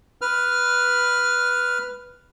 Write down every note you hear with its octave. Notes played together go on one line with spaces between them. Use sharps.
B4 F6